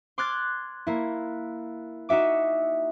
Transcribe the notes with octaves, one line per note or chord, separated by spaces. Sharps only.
C6 D6 F6 F#6 G#6 A6
A#3 E4
D#4 F#4 E5 D6